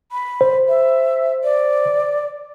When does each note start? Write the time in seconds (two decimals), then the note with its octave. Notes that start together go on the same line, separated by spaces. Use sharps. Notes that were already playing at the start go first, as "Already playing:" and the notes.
0.12 B5
0.41 C5
0.68 E5
1.44 D5